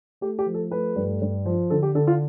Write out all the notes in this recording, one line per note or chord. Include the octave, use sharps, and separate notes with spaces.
A3 G4
G4
F3
A4
A3 B4
G2
G2
F3
D3 A4
G4
D3 A4
F4